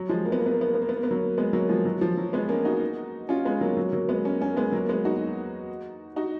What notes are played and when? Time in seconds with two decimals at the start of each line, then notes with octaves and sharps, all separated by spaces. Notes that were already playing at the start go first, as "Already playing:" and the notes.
Already playing: F#3
0.09 F3 G#3
0.25 A#3
0.32 B3
0.40 A#3
0.46 B3
0.53 A#3
0.61 B3
0.68 A#3
0.75 B3
0.82 A#3
0.89 B3
0.97 A#3
1.03 B3
1.10 F#3 A#3
1.38 G#3 B3
1.53 F#3 A#3
1.69 F3 G#3
1.85 F#3
2.01 F3
2.18 F#3
2.33 G#3 B3
2.49 A#3 C#4
2.65 D#4 F#4
3.29 C#4 F4
3.45 G#3 B3
3.61 F#3 A#3
3.77 F#3
3.93 F#3 A#3
4.09 G#3 B3
4.25 A#3 C#4
4.41 A#3 C#4
4.57 G#3 B3
4.72 F#3 A#3
4.89 G#3 B3
5.05 D#4 F#4
6.16 D#4 F#4